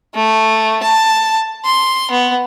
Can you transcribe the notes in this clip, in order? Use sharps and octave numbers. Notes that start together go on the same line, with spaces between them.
A3
A5
C6
B3